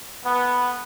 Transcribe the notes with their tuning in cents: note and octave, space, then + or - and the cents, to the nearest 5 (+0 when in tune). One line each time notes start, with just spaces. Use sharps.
B3 +0 A4 +15